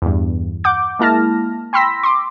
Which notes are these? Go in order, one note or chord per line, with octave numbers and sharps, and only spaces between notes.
E2 G2
F#5 D6 G6
G#3 A#3 E4 A5 F6 A#6
G5 B5 C6 E6 A#6 B6
C6 D6